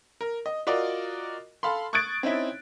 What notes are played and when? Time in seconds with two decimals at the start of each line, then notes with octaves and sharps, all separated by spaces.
0.21 A#4
0.46 D#5
0.67 F4 F#4 A#4 D5 D#5
1.63 A4 F5 B5 C6
1.93 C#6 D#6 F#6 G#6 A6 D7
2.23 C4 C#4 D#4 E4